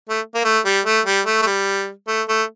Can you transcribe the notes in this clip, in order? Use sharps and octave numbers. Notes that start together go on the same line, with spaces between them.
A3
A#3
A3
G3
A3
G3
A3
A3
G3
A3
A3